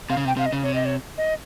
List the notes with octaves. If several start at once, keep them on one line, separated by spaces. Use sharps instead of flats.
C3 F5
C#3
C3 G5
C3 F5
D#5
C#3
C3 C#5
D#5
C#5
D#5